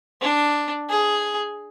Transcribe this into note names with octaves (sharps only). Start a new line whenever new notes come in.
D4
G#4